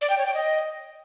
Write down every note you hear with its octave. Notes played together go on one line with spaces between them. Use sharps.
D5
G5
C#5
G5
D#5